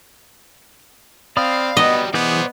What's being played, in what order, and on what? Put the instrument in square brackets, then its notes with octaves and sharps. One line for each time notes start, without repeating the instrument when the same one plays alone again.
[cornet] C4 [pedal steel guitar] D5 B5 D#6 [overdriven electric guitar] F5
[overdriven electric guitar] F#3 G3 [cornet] B3 [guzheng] D#5
[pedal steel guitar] E3 G#4 G6 [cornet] B3 [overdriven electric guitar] C5 D5